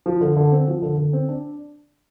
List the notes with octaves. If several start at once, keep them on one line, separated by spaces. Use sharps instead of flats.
F3
D3
D3
C4
F3
D3
D3
C4
D4